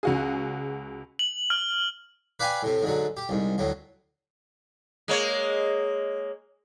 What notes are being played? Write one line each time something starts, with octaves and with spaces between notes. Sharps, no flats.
C#2 F#4 G#4
F#7
F6
B4 D5 F5 G5 G#5 B5
A2 C3
G#2 D3 F#3
G4
C2 G#2
D2 A2 F#3
G#3 A#3 C#5